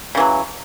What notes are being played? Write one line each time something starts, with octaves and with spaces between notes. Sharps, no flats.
C#3 E3 F#3